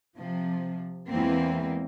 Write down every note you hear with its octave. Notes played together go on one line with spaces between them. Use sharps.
C3 F3
E2 E3 G#3 A#3 C4